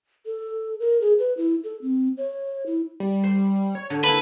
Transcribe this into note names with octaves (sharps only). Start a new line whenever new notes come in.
A4
A#4
G#4
B4
E4
A4
C4
C#5
E4
G3
C5
C#5
D3
A#3 E4 B4 A5